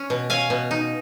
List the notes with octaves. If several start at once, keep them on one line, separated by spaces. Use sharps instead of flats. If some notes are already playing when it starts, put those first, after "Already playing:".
Already playing: C#4
B2
C#4 F5 G#5
B2
D#4